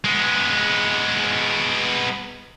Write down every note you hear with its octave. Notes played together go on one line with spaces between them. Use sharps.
G#3 B3